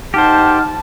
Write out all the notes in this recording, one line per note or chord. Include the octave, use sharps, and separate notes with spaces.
D#4 G4 C5 F#5 A5 F6